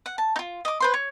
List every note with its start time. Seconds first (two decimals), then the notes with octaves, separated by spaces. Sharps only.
0.06 F#5
0.18 A5
0.36 D#4 F4
0.65 D#5 D6
0.80 B4 C5 C6
0.94 C#5